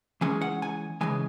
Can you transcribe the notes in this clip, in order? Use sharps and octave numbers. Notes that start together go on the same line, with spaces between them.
E3 G#3 C#4 G#5
F#5
G#5
C#3 E3 G#3 G#5